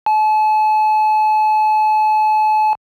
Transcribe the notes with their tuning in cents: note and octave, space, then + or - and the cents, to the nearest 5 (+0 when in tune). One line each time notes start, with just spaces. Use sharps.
A5 -40